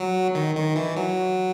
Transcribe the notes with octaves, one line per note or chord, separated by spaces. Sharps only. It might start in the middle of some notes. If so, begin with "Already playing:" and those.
Already playing: F#3
D#3
D#3
E3
F#3